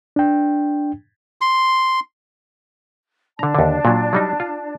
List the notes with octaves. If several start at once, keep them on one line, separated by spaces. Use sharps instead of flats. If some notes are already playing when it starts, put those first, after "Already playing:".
D4 G5
C6
D3 D4 D5 A5 A#5
D#2 D3
A#2 F#3
F#3 G3 D#4
F4